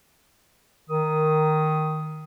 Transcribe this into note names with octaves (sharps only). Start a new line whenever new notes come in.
D#3 D#6